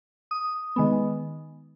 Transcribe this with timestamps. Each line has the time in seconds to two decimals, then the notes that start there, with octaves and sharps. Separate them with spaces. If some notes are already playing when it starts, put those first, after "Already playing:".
0.31 D#6
0.76 D#3 G#3 B3